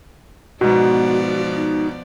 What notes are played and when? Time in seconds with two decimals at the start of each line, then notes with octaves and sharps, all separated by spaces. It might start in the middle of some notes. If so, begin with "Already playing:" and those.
0.61 G#2 B2 F3 B3 F#4 D5
1.55 D#4